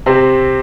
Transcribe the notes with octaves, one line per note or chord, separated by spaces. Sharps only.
C3 C4